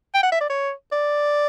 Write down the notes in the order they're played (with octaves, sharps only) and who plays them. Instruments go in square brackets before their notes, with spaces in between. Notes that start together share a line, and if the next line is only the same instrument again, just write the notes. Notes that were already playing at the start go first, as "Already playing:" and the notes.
[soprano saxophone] G5
F#5
E5
D5
C#5
D5